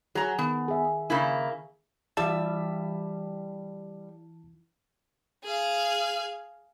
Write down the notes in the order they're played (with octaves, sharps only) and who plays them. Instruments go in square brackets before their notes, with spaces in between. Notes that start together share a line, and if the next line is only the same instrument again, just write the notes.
[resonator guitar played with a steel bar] F#3 A#5 [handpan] G#4
[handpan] D#3 [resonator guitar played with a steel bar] B3
[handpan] G#4 E5
[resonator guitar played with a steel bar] C#3 A#3 E4
[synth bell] E3 E4 [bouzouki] G3 E5 [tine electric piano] A5
[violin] G#4 F5